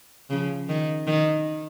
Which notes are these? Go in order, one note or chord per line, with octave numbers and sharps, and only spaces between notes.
C#3 F3
D#3
D#3